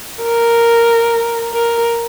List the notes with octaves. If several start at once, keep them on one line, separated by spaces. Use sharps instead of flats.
A#4
A#4